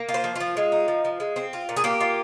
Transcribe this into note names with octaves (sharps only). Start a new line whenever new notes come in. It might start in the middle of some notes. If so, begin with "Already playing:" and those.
Already playing: A#3
F4
C5
F3
F3 F4
G#3
D#4
F3
F3
G#3
C4
F4
A#2
G#4
A#3 G4
F4